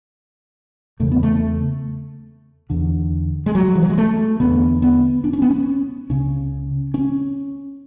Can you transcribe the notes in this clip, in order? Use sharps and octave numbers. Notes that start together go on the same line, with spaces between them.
E2 C#3 A3
B3
A3
E2 D3
G#3
F#3
E3
F#3
G#3
A3
E2 D3 B3
B3
D4
C#4
B3
C#4
C#2 C#3 C#4
C#4